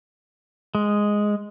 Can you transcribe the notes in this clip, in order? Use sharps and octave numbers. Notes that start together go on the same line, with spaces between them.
G#3